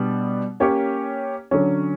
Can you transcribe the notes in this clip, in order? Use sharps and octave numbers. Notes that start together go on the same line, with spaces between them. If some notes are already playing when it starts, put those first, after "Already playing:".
Already playing: B2 G3 B3 D4
A#3 C#4 G4 C#5
D3 F#3 C#4